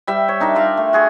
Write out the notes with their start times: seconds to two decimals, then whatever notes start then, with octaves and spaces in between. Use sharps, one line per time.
0.07 G3 E5 G5
0.29 C#5
0.40 D4 D#4 A#4 E5
0.55 F4 D5 E5 F5
0.77 A3
0.93 F#4 G#4 C6